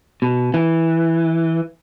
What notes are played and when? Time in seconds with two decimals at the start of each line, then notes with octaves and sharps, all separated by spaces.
0.22 B2
0.54 E3